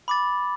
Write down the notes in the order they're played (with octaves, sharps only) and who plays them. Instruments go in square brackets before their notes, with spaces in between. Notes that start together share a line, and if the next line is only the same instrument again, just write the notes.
[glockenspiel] B5 D6 A6